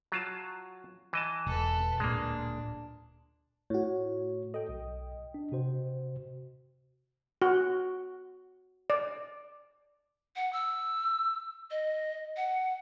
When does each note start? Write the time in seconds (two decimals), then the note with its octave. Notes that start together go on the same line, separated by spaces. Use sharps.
0.12 F#3 F4 A5
1.13 E3 D#5 A5
1.46 E1 A4 B4
2.00 D1 A#2 G#3 A#3 D4
3.70 A2 F#4 C#5
4.54 A4 D#5 G5
4.69 B1
5.34 D4
5.52 C3 F#4 C5
7.42 F#4
8.90 D5
10.36 F#5
10.53 E6
11.71 D#5
12.37 F#5